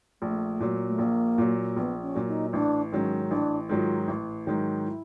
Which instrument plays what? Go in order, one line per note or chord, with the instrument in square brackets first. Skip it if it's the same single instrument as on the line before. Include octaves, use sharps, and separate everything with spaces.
[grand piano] A#1 [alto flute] A3
[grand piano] A#2 F#3
[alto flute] A3
[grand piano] A#1 [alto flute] A#3
[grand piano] A#2 F#3
[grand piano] A#1 [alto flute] B3
[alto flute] C#4
[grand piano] A#2 F#3
[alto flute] D#4
[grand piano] A1 [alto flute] D4
[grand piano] G#2 D#3 F#3 [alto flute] C#4
[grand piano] A1 [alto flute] D4
[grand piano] G#2 D#3 F#3 [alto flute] F4
[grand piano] A1
G#2 D#3 F#3
[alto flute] E4